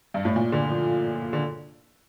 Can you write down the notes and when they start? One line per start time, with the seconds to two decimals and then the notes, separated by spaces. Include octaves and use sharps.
0.14 G2
0.25 A2
0.36 A#2
0.52 D3
0.70 F3
1.33 D3